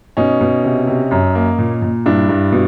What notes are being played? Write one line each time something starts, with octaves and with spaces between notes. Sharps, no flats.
B2 C#4 D#4
B2
C3
C3
F#2
A#3
A#2
A#2
G2 D4 E4
G2
B2